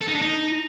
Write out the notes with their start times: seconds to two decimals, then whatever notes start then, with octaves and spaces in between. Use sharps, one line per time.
0.01 A4
0.08 D#4
0.15 D4
0.22 D#4